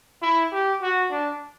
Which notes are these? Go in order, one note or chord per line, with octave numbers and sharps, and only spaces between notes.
E4
G4
F#4
D4